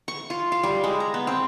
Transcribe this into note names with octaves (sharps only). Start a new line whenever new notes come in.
C#6
F4
F5
G3
G#3
A#5
B3
C4